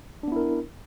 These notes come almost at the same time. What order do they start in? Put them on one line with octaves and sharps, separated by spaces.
D4 B3 E4 A#4